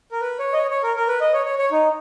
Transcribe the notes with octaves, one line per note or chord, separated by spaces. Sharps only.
A#4
B4
C#5
D#5
C#5
C#5
A#4
A#4
B4
D#5
C#5
C#5
C#5
D#4